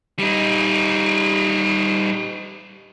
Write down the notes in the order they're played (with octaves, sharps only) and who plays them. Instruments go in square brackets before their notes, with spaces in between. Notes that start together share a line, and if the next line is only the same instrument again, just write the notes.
[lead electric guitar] G3 D#4